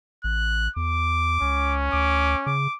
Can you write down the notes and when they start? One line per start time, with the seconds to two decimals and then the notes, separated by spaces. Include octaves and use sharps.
0.24 A1 F#6
0.76 E2 D6
1.41 C#2 C#4
1.93 D2 D6
2.46 C#3 D6